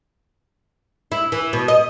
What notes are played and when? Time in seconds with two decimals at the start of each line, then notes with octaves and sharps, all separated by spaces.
1.12 E4
1.32 E3
1.53 B2
1.68 D#5